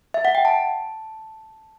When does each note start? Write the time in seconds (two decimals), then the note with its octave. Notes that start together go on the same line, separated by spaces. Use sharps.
0.14 E5
0.25 F#5
0.35 G5
0.45 A5